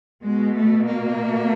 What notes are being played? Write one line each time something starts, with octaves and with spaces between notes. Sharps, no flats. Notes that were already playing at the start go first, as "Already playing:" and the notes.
B2 G#3
A3
A#3